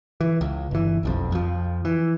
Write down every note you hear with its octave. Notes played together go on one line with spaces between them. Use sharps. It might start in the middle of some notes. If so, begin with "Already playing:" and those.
E3
C#2
G1 E3
F#1 B1 F2
F2 F3
E3